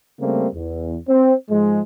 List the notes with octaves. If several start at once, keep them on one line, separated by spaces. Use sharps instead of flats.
C#3 G3 A3 A#3 C4
E2
C4
G#2 F3 G#3